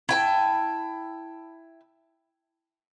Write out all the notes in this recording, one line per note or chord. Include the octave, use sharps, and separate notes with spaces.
E4 G5 A5